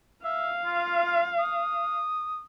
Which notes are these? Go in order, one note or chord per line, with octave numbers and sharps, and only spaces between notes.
E5 F5
F4
D#6